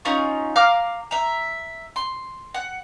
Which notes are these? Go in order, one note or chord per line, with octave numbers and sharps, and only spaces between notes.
C#4 D#4 F4 C#6
F5 A#5 D6 F6
E5 A#5
C6
F#5